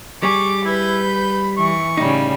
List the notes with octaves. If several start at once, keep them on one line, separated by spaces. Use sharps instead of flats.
G3 G#4 C#6 D6
E4 B4 G6
B5
E3 C#6
A2 C#3 G3 D#4